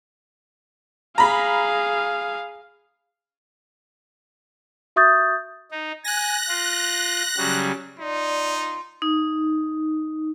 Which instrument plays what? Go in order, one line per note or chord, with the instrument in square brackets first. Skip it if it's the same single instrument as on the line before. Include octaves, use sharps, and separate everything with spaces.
[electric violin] G#4 F5 [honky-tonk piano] A#5 B5
[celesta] F#4 E5 C#6 D#6 G6 A6
[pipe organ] D#4
[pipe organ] G#5 [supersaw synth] F#6 A#6
[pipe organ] F4
C#3 F#3 G3
[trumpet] D#4 [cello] F4 [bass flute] D5
[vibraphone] D#4